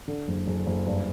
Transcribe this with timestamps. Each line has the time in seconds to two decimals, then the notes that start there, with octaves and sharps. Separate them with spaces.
0.08 D3
0.28 F#1
0.47 F#1
0.67 F#1
0.86 G2